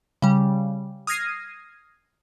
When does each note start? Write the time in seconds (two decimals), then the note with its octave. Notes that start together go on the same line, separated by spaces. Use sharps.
0.22 C#3 G3
1.07 D#6 F6 G#6 A#6 C7 D#7